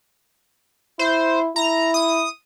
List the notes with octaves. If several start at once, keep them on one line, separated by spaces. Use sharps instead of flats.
E4 C5
E4 A#5
D#6